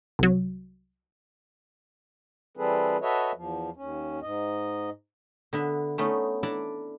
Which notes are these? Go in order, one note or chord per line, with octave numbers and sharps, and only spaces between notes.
C2 F#3
E3 G3 C4 G#4 A4 B4
F#4 A4 B4 C#5 D#5 E5
E2 F3
D#2 C#4
G#2 D#5
D3 B3 E5
A3 B3 C#4 D#4
D4 E4 A4 D5 A5 A#5